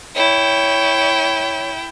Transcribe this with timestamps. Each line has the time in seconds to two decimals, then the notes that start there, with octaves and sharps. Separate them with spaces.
0.16 E4 C#5 G5